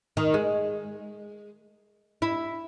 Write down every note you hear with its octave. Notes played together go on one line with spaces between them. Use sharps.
D#3
G#3
E4